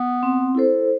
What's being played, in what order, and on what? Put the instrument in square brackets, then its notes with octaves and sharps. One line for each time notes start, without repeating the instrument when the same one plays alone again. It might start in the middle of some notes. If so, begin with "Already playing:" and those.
Already playing: [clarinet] B3
[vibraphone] C4
E4 A4 C5